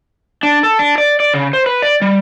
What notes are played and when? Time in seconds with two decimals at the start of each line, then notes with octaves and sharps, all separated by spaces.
0.43 D4
0.63 A4
0.79 D4
0.98 D5
1.20 D5
1.34 C#3
1.53 C5
1.66 B4
1.82 D5
2.01 G3